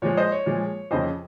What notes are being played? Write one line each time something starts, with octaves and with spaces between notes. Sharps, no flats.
A#2 F3 G#3 C#5
C5 D#5
C#5
A#2 F3 G#3
F2 C#3 F3 C5 D#5